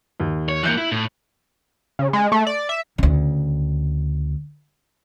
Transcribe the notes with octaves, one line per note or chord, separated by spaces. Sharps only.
D#2
C#5
E3 A#3 F#6 G6 C#7
E4
A2
C#3
G#3
A3
D5
E5
D2 C#3